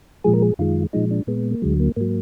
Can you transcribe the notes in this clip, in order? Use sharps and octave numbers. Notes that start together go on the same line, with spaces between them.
A#2 F3 G#3 G#4
A#4
G#4
F#2 D#3 G#3 F4
A#2 F3 G#3 D#4
D4
A#2 G#3 B3
A#3
D2 D3 F#3 G#3
A#3
G#2 F#3 A#3